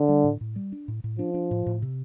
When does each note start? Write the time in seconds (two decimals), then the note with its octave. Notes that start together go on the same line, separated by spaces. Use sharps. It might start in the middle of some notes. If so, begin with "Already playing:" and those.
Already playing: D3
0.09 G3
0.24 A2
0.41 A2
0.56 G3
0.72 D4
0.88 A2
1.04 A2
1.19 F3 D4
1.34 D4
1.51 A2
1.66 A2
1.82 C3